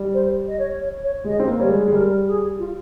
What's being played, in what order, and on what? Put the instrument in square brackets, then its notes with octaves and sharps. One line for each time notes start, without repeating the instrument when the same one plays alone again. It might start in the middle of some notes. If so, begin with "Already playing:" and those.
Already playing: [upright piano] G3
[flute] C5
D#5
C#5
C#5
C#5
[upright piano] G#3 [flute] D#5
[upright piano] C4
[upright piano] A#3 [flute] C5
[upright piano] G3 [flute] C#5
[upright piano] G#3
G#3
[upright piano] G3 [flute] A#4
[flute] G#4
F4